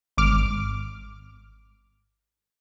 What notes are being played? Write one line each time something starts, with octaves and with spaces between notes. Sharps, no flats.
G#1 D6 F6